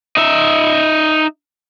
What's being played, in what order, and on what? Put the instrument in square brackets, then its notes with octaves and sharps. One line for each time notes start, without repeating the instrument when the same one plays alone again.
[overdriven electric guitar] D#4 E5